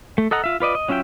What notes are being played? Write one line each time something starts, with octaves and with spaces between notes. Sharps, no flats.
A3
A4 D#5 F#5 A#5
F4 E5
F4 B4 D5 D#5
D#5
F#3 C#4 F4 E5 G5